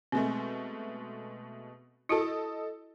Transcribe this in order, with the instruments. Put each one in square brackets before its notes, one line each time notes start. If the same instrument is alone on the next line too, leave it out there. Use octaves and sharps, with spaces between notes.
[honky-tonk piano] B2 G#3 A3 [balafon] C4
[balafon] E4 F#4 A5 [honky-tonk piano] A4 D#5